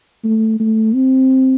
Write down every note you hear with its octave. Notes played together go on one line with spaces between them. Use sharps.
A3
A3
C4